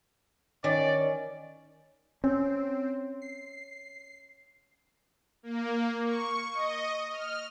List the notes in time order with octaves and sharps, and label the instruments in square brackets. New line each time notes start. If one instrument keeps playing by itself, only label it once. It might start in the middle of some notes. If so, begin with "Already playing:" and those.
[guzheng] D#3 [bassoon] C#4 [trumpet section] D5
[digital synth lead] C4 [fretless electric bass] C#4
[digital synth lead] C7
[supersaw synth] A#3
C#6
D#5
F6